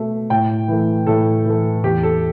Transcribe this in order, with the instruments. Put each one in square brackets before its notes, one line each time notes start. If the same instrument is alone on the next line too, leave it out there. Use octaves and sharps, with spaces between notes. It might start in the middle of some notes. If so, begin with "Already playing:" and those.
Already playing: [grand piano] B2 A3
A2 G5
E3 A3
A2 A4
E3 A3
E2 G4
A4